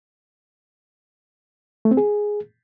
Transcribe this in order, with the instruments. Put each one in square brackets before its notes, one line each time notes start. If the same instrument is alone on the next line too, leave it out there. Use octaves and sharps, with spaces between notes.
[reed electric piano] A3
C4
G#4